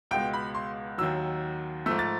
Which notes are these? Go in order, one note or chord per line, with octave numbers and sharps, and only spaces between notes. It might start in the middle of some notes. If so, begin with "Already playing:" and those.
C#2 B2 G#3 G5
B5
C6
D#2 D#3 F#3 E6
G#2 F3 A3 E6
A6